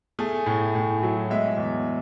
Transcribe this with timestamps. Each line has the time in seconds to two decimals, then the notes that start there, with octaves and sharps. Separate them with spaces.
0.19 A3 G#4 G#5
0.46 A2
0.75 A2
1.03 F#3
1.30 G#3 E5
1.58 E2